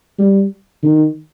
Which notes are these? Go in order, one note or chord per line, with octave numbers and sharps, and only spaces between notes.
G3
D#3